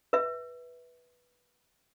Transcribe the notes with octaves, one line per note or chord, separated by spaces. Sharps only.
B4 E5